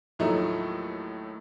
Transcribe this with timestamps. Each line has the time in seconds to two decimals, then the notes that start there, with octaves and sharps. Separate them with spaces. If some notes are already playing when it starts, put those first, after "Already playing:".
0.19 D#2 A2 F3 F#3 A3 D#4